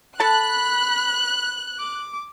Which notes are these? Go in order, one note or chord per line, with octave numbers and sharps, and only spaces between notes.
A4 A5 B5 F#6
D6